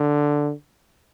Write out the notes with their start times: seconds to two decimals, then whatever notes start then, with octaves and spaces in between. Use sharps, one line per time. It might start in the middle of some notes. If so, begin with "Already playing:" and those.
Already playing: D3